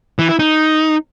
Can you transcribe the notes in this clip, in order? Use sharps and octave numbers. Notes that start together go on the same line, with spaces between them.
E3
E4
D#4